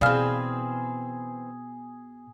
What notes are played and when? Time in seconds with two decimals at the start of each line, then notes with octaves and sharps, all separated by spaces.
0.01 B2 E3 C4 G#4 D5 F5 F6